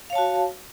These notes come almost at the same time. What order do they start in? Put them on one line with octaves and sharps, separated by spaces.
F5 C#5 A5 F#4